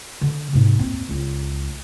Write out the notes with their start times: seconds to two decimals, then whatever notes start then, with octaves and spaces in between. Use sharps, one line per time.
0.21 D3
0.53 G#2 C3
0.79 D#1 C4
1.09 C#2